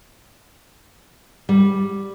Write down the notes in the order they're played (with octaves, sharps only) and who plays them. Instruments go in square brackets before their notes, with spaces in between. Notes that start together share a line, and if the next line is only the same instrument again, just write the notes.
[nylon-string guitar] G3